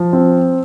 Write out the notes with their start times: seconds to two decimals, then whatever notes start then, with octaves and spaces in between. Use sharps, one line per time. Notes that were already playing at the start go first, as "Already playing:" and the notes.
Already playing: F3
0.13 C4